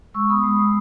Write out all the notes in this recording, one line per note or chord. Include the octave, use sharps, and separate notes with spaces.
G#3 C#6 E6
B3 B5 D#6
G#3
G#3